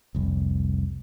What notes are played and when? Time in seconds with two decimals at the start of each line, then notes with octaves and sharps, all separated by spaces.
0.15 F1 C2